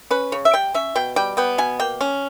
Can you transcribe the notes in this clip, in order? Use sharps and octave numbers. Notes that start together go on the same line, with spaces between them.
C#4 B4
C#3 C#5
E5
G3 G5
C#4 E5
B2 G5
G3 G5
B3 G5
B2 G#5
A#3 G5
C#4